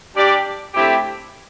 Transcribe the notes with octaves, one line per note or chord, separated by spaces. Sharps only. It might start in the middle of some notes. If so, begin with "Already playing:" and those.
G3 D4 G4 D5
D3 A3 C4 E4 G4